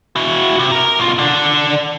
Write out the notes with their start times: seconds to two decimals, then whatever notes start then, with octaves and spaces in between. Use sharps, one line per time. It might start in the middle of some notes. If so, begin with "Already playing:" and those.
0.16 E4 F#4
0.59 C3
0.72 A#4 A#5
0.99 B2 F4
1.18 D3 D4